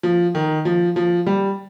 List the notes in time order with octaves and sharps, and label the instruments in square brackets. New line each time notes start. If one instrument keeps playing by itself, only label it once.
[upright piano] F3
D#3
F3
F3
G3